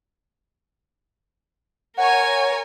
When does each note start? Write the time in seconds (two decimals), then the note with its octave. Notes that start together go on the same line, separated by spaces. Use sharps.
1.97 A#4 C#5 F#5 G#5